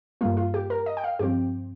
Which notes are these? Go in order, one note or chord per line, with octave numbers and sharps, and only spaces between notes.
G2 G3 A#3 F4
F4
G4
A#4
D#5
G5
F5
G2 F3 C4 G4